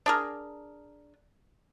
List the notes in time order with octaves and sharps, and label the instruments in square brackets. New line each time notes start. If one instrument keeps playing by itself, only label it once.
[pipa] D4 G#4 A#4